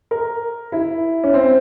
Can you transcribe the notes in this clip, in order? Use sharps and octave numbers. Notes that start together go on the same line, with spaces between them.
A#4
E4
C#4
C4